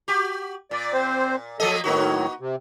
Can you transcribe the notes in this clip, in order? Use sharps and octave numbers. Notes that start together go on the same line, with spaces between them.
F#4 G4
A#2 D5
C4 C5
F3 F#3 A#3 A4 D#5
A2 D#3 F#3 A#3 D#4 F#4
C3